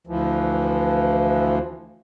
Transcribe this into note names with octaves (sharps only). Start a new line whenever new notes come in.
D2 E3 F3